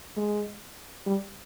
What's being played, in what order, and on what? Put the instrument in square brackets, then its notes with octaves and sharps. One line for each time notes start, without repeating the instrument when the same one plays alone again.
[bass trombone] G#3
G3